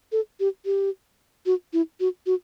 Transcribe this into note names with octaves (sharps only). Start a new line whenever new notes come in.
A4
G4
G4
F#4
E4
F#4
F#4